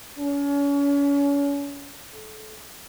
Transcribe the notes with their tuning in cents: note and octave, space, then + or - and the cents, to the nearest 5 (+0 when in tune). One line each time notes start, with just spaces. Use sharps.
C#4 +35
A4 -30